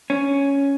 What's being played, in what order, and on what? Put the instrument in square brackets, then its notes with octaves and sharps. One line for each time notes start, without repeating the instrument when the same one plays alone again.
[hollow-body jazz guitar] C#4